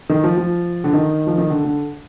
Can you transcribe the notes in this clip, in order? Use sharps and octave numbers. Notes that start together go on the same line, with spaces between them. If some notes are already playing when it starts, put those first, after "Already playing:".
D#3
F3
F3
D3
D#3
F3
D#3
D3
D3